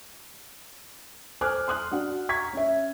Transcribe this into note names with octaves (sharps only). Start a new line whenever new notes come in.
A4 C5 G#5 D6 F6 F#6
C6 D#6 F#6
D4 F#4 F#5
A#5 C#6 G#6 B6
C#4 E5